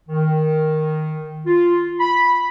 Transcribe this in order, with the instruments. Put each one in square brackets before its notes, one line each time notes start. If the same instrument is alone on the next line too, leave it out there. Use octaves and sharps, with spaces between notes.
[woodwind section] D#3
F4
B5